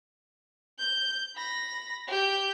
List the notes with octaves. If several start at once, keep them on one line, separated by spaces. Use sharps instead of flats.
G6
B5 A#6
G4 G6